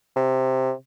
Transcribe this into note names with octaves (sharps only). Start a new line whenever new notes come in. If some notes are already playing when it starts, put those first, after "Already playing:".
C3